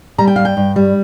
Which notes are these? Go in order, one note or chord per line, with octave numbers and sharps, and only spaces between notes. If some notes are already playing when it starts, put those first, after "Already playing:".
G3 A#5
G5
G2 F5
G5
G2
G3